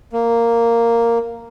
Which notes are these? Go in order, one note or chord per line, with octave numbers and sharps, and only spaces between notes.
A#3